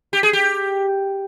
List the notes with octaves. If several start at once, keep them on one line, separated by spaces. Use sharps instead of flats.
G4
G#4
G4